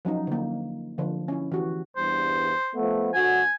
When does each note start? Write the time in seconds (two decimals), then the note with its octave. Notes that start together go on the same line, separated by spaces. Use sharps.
0.05 F3 F#3 C#4 D#4
0.27 D3 A#3
0.98 D3 F3
1.28 C#4 E4
1.52 E3 F#4 G4
1.97 E2 G2 C5
2.75 F3 A3 B3
3.14 D2 F#4 G#5